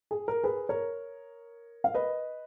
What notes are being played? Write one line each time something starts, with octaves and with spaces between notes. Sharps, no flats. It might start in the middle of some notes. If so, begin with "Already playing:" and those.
G#4
A#4
G#4 B4
A#4 C#5
F5
B4 D#5